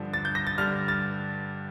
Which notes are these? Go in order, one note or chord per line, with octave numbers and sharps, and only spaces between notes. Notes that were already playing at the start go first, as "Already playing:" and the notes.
Already playing: G2 D3 F3
A6
G6
A#6
A6
G2 D3 G3 F6
A6